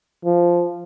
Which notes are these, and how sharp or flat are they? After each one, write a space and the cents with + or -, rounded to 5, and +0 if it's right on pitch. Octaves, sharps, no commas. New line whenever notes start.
F3 -5